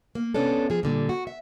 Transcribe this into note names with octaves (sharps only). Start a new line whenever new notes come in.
A#3
C3 B3 C#4 D4 A4
F3 G#4
A#2 D3 G3
F#4
E5